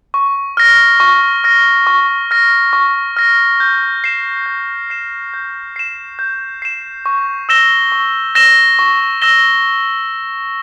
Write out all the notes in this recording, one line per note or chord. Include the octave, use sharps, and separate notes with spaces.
C#6
F6 A#6
C#6
F6 A#6
C#6
F6 A#6
C#6
F6 A#6
G6
C7 E7
G6
C7 E7
G6
C7 E7
G6
C7 E7
C#6
E6 A#6 E7 G7
C#6
E6 A#6 E7 G7
C#6
E6 A#6 E7 G7